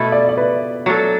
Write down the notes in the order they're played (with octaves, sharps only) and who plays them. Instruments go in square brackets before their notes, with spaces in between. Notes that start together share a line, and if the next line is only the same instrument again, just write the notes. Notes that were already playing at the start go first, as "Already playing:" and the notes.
Already playing: [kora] B2 A3 E4 A4
[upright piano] D5
D5
B4
[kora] F#3 D4 A4